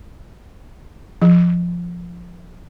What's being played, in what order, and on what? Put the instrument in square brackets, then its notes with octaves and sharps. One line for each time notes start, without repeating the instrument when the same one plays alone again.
[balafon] F3